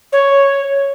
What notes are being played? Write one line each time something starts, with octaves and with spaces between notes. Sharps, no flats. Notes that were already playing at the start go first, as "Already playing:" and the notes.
C#5